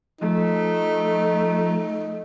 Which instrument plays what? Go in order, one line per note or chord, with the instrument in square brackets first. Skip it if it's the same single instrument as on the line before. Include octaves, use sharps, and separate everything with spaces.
[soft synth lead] F3 [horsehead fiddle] A3 [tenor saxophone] D#4